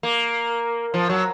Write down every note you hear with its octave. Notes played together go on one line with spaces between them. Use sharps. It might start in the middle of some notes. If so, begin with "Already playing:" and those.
A#3
F3
F#3